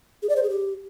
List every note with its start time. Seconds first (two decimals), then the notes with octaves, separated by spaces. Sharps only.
0.22 G#4
0.29 D5
0.36 C5
0.43 G#4
0.50 G4